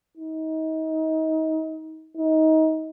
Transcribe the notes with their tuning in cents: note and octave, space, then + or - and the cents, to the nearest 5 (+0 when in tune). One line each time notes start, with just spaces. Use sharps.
D#4 +30
D#4 +25